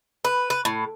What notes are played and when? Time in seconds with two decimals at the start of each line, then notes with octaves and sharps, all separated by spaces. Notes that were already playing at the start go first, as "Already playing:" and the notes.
0.25 B4
0.50 B4
0.65 A2